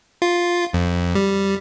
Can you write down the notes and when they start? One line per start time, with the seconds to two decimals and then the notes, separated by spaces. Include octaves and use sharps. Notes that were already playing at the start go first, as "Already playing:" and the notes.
0.22 F4
0.74 F2
1.15 G3